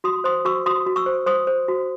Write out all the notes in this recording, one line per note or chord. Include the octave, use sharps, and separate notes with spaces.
F#4 C6 D#6
C5 C6 D#6
F#4 C#6 E6
F#4 C6 D#6
F#4
C#6 E6
C5
C5 C6 D#6
C5
F#4